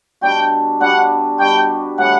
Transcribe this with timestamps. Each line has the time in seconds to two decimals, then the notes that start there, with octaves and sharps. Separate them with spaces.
0.21 B2 G3 D4 F#4 G5
0.80 B2 G3 D4 F#4 F#5
1.38 B2 G3 D4 F#4 G5
1.98 A2 E3 G3 F#5